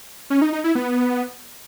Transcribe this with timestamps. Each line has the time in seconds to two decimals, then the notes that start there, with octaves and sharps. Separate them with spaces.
0.30 C#4
0.42 D#4
0.53 D#4
0.64 E4
0.75 B3